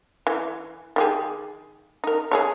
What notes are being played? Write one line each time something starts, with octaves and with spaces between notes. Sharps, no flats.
E3
D#3 G4 G#4
D#4 A#4
G#4 A4 C#5